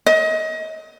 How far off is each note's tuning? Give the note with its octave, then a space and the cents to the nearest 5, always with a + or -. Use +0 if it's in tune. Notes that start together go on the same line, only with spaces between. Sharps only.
D#5 +30